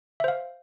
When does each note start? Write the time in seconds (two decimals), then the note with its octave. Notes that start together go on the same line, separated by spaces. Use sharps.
0.20 E5
0.24 C5
0.28 F5